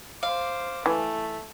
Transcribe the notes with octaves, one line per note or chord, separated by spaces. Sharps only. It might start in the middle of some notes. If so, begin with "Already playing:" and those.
C5 F5 D6
E3 A3